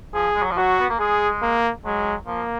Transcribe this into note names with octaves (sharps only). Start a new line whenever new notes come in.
F3 G#4
G#3
F#3
F3
F#3 F#4
B3
A#3
G#3 G#4
A#3
F#3 G#3
F3 A#3